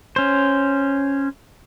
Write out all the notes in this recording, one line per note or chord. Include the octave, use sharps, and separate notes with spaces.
C#4 C5